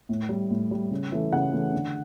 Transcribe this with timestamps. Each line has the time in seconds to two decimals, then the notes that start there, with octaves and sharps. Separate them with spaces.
0.09 A2
0.29 G3
0.51 A2
0.71 G3
0.91 C#3
1.12 E3 A3
1.33 C#3 F#5
1.53 E3 A3
1.73 D3